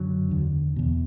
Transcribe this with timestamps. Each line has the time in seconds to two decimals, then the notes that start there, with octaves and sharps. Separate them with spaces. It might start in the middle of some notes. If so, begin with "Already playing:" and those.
Already playing: F#2 D3 F#3
0.30 E2 D3
0.76 E2 B2